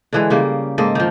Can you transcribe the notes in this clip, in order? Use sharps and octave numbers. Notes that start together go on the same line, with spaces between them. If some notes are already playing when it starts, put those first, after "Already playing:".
D3 E3 G#3
C#3 G3 A#3
G#2 A#3 A4 D#5
D#3 F3